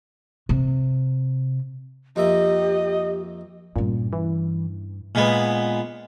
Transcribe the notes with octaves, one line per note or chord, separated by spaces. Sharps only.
C3
F2 A#3 G4 D#5 E5
G2 A#2 C#4
E3
A#2 G#3 B3